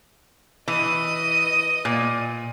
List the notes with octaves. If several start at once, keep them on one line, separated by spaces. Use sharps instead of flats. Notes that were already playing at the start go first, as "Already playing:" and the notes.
E3 D#5 D#6
A#2